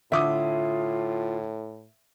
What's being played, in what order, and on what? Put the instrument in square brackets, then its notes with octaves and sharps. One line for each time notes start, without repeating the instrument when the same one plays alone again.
[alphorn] A2 [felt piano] D3 D6 D#6 [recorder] F4 [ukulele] E5